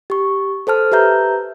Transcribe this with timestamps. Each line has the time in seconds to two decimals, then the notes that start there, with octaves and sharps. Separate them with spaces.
0.10 G4 C#6
0.67 A4 C5 A5 F6
0.92 G4 B4 E5 A#5 G6